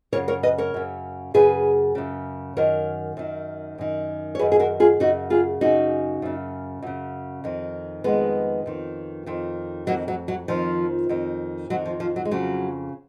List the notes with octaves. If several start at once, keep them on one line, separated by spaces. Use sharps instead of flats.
F#2 C#3 A#4 C#5
A#4 C#5
B4 D#5
A#4 C#5
F#2 C#3
F#2 C#3 G#4 B4
F#2 C#3
F#2 D#3 A#4 C#5
F#2 D#3
F#2 D#3
C#5
F#2 D#3 G#4 B4
G#4
F#4 A#4
F4 G#4
F#2 C#3 D#4 F#4
F4 G#4
F#2 C#3 D#4 F#4
F#2 C#3
F#2 C#3
F2 D#3
F2 D#3 G#3 B3
F2 D#3
F2 D#3
F2 D#3 F#3 A#3
F#3
F#3
F2 D#3 F3
F2 D#3
F2 D#3 F#3
F3
F3
F#3
G#3
F2 C#3 F#3